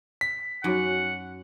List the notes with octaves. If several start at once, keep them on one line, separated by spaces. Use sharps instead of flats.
B6
F#2 D#4 F#4 C#5 F#5